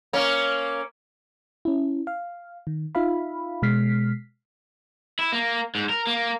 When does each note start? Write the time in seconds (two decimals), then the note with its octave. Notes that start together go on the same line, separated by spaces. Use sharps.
0.13 A#3 C#4
1.65 C#4 E4
2.07 F5
2.67 D#3
2.95 D#4 F4 E5 F5 B5
3.62 B2 G#3 F6 B6 C7
5.19 E4
5.32 A#3
5.75 G#2
5.90 A#4
6.07 A#3